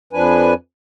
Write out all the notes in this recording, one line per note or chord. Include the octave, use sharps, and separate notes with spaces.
F2 F3 D4 B4 G#5